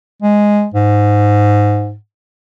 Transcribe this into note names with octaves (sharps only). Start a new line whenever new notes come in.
G#3
G#2